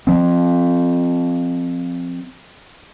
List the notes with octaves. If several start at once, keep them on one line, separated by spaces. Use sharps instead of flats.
F3 C4